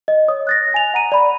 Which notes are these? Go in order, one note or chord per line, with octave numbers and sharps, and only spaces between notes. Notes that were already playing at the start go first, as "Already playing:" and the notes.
D#5
C#5 D#6
F#6 A6 A#6
G#5 F7
F#5 A#5 D#7
D5 B5